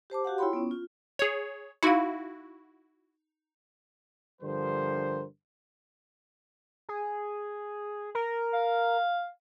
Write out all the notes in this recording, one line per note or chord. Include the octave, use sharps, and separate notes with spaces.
G4 C5 A5 D6
F#4 G4 F5 F#5
E4 F4 C#5 G5 B5 C6
B3 C#4
F4
G#4 C#5
D#4 E4 F#4 F5
G2 D3 F3 G3 A#4 C5
G#4
A#4
F5